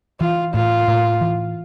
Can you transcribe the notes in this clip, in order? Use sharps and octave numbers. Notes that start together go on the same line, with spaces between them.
E3 F4
A2 F4
A2
E3